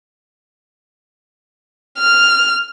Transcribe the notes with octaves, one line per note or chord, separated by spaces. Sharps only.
F6